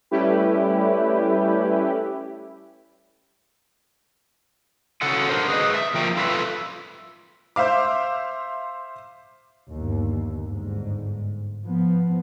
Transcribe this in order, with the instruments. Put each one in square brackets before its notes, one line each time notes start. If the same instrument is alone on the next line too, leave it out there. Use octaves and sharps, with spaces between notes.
[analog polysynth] G3 A3 C#4 E4 G4 B4
[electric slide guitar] C#3 F#4 A4 F#5 G#5
D4 A#4 C5
G#4 B4 D#5
E5
F3 A#3 A#4 G5
F4 A4 B4 D5 E5
[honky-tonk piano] C5 E5 F5 D6
[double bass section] G1 D#2
G1 G#2
F3 B3